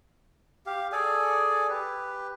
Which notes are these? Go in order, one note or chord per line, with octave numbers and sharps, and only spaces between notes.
G4 F5
G#4 A4 D5 G#5
G4 B4